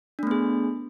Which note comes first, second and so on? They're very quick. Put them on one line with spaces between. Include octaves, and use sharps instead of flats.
D4 A3 B3 G#4